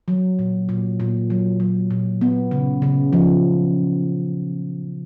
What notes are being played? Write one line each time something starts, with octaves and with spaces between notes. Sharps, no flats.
F#3
A#2
A#2
A#2
F#3
F#3
A#2
B3
C#3
C#3
F3